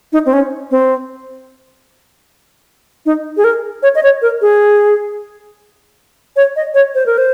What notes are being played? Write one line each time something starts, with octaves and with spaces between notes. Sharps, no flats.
D#4
C4
C#4
C4
D#4
G#4
A#4
C#5
D#5
C#5
A#4
G#4
C#5
D#5
C#5
C5
A#4
C5